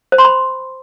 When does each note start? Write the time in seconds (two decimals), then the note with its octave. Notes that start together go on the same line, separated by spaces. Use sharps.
0.12 C5
0.18 C6
0.25 B5